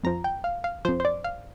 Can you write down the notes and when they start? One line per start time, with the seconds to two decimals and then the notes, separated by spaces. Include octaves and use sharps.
0.04 F2 F3 A#5
0.24 G5
0.44 F5
0.64 F5
0.85 F2 F3 C5
1.00 C5
1.05 D5
1.24 F5